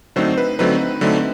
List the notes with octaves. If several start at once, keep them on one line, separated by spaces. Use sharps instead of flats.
D3 F#3 A3 C4 D#4 C5
B4
D3 F#3 A3 C4 D#4 B4
D3 F#3 A3 C4 D#4